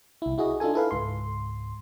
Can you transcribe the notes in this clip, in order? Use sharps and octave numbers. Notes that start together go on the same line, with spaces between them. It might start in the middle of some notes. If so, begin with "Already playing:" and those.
C2 E4
E4 F#4 G#4 D#5
D4 D#4 F4 A4 G#5
E4 A4 B4 F5
C#2 G#2 C6